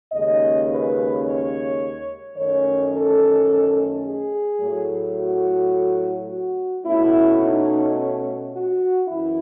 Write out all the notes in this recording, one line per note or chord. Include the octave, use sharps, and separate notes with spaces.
D#2 C#3 G#3 C#4 D#5
B4
C#5
F#2 D#3 A3 C#4 C#5
A4
G#4
A2 F#3 A3
F#4
F#4
B2 A3 C#4 E4
D#4
F#4
F#2 E3 E4